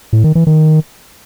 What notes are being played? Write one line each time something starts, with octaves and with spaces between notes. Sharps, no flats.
A2
D#3
E3
D#3